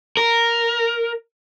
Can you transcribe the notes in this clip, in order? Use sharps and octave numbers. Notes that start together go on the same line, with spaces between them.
A#4